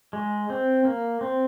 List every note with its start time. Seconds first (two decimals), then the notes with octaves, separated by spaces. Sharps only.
0.13 G#3
0.50 C4
0.85 A#3
1.21 C4